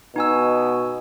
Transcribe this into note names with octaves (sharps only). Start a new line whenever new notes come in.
B2 D#4 G#5 E6